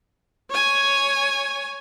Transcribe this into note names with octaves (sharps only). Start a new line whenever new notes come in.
C#5 G#5